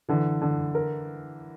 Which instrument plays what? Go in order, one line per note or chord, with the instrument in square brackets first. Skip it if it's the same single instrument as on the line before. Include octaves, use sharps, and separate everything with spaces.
[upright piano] D3 [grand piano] E3
[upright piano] D3
A#4